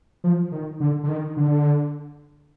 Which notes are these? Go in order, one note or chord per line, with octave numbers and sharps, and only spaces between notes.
F3
D#3
D3
D3
D#3
D3